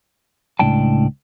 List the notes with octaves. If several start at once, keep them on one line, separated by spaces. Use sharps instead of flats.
C#2 A2 D4 G5 A5